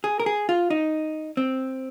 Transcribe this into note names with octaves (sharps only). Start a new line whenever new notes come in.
G#4
A#4
G#4
F4
D#4
C4